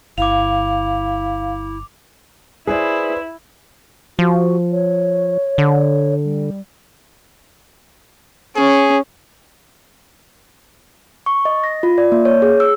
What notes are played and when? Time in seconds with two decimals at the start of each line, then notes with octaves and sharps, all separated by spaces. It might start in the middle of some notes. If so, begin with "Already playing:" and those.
0.18 G1 E4 F5 D6 F7
2.67 E4 G#4 B4 C5 D5
4.19 F3 F#4
4.71 C#5
5.58 D3
6.23 G3
8.56 C#4 G#4
11.26 C#6
11.45 D#5
11.64 A#6
11.83 F4
11.98 D5
12.12 A#3
12.25 C#5
12.42 G#4
12.60 E6